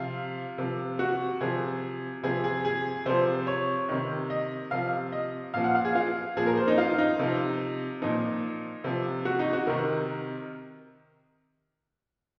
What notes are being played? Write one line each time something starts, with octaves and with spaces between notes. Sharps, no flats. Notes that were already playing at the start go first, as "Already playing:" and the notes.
Already playing: C3 F3 F4
C3 F3
F#4
C3 F3 G#4
C3 F3 G#4
G#4
G#4
C3 F3 C5
C#5
C3 D#3
D#5
C3 F3 F5
D#5
A#2 F3 F5
F#5
F5
G#4
F4
A#2 F3 G#4
A#4
C5
D#4
F4
D#4
C3 F3
A#2 F3 D#4
C3 F3
F#4
D#4
F#4
C3 D#3 A#4